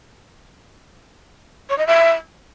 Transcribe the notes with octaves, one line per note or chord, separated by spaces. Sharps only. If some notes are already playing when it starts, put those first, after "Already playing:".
C#5
D#5
E5